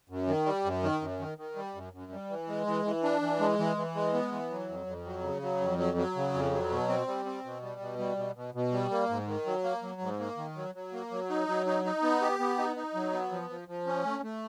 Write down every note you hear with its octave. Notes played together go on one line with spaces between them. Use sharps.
F#2
D#3
G3
F#2
D#3
F#2
D#3
D#3
G3
F#2
F#2
G3
E3
G#3
E3
E3
D4
E3
G#3
E3
E3
G#3
B3
E3
F#3
F2
F2
F#3
C#3
F#3
F2
F#3
F#3
C#3
F2
F#3
B2
C4
G3
C4
B2
G3
B2
G3
B2
B2
B2
G3
A#3
G#2
D#3
F#3
A#3
F#3
G#2
A#3
D#3
F#3
F#3
A#3
F#3
D#4
F#3
D#4
D#4
B3
G4
B3
D#4
D#4
F#3
B3
F3
F3
F3
C#4
A3
A3